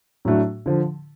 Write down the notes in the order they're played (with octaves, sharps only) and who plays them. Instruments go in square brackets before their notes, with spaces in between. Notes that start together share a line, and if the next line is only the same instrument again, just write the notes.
[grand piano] A2 F#3 A3 D4 F#4
D3 F3